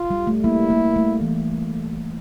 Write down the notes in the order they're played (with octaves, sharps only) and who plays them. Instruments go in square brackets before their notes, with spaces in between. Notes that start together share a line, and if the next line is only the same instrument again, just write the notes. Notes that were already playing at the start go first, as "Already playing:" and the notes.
Already playing: [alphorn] F4
[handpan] G3
A3
[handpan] G3 A#3 [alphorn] E4
[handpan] G3 A#3
A3
E3